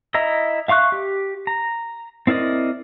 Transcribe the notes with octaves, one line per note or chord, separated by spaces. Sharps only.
E4 D#5 E5 A#5
E5 F5 C6 C#6 F#6
G4
A#5
C4 E4 A#4 D5 D#5